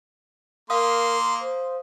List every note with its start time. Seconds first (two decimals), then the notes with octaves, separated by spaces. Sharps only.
0.70 A#3 A#4 F5 C6 D#6
1.41 C5